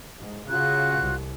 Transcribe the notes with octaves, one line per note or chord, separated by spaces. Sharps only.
G#2
C#3 F4 F#4 F#6
C2